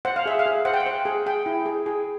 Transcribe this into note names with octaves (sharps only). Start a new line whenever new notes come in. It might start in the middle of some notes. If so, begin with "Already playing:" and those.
C5 F#5
F5
G#4 E5
F5
G#4
C5 F#5
G5
F#5
C5
G#4
G#4 G5
E4
G#4
G#4